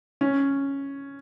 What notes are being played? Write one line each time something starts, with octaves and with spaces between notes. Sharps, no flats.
C#4